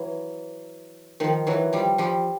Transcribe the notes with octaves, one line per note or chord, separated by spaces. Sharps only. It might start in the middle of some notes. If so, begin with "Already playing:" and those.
Already playing: E3 F#3
D#3 F3
E3 F#3
F3 G3
F3 G3